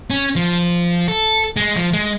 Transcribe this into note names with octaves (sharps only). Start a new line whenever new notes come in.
C#4
F3
A4
G#3
F3
G#3